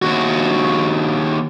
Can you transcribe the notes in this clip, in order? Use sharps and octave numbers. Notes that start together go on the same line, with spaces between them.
D#2 F#4